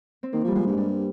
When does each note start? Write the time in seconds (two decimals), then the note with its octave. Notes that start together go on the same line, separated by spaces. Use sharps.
0.23 C4
0.33 D#3 A#3
0.44 F3
0.47 G3
0.55 F3 G#3
0.67 G2 G#3
0.77 G2 G3